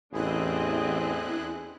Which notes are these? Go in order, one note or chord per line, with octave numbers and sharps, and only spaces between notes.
A1 E2 C4 D4 E4 G#4 D#5 F#6